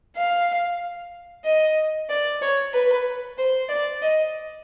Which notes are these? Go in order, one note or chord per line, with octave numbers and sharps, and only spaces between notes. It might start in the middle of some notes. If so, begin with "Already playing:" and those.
F5
D#5
D5
C#5
B4
C5
D5
D#5